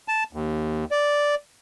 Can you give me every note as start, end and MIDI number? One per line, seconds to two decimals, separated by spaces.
0.08 0.24 81
0.33 0.85 39
0.91 1.35 74